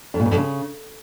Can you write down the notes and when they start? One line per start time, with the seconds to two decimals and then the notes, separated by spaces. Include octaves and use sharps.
0.14 F2
0.20 A#2
0.25 G#2
0.31 F2
0.37 C#3